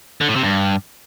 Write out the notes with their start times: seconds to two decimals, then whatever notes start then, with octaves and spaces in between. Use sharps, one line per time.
0.21 D3
0.28 A2
0.36 C3
0.43 G2